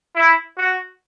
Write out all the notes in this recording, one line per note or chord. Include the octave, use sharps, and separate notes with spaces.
E4
F#4